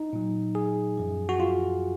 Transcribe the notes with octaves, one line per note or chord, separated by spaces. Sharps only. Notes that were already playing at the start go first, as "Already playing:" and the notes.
Already playing: D#4
A#2 F#3
G#4
F#2 F3
F#4
F4